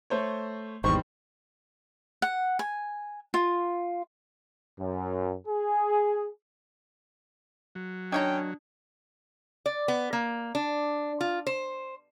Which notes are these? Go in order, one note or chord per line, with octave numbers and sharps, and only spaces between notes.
A3 C5 C#5
G#1 E2 D#3 G3 C5 C#6
F#5
G#5
F4
F#2
G#4
F#3
D#3 C#4 D4 C#5 G5 A#5
D5
B3
A#3
D4
F4
C5